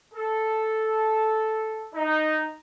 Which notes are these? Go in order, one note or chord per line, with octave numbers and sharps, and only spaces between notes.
A4
D#4